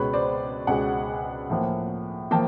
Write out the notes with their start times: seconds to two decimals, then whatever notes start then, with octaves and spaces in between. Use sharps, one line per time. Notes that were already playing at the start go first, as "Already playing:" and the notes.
Already playing: C#2 B2 G#3 B4 C#5
0.13 C5 D5
0.67 C#2 B2 G#3 F#5 G#5
1.50 A2 F3 A#3
2.31 F3 A#3 G5 A5